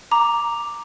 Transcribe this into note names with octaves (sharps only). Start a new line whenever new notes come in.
A#5 D6